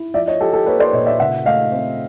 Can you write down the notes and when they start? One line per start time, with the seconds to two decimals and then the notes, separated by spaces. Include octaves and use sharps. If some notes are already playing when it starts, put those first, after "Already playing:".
Already playing: E4
0.14 F3 D5 E5
0.27 C#5 D#5
0.41 F3 G4 A4
0.53 G4 A4
0.66 A#3 B4 C#5
0.80 C5 D5
0.93 A#2 C#5 D#5
1.06 D5 E5
1.20 C#3 E5 F#5
1.45 A3 D#5 F5
1.72 C4